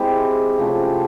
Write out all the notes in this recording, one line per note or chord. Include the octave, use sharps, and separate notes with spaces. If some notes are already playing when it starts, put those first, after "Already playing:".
Already playing: G#3 C4 E4 G4
C3 F3 A3 C#4